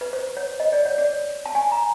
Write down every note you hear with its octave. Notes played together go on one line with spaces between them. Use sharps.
B4
C5
C#5
D#5
D5
C#5
D5
A5
G#5
A#5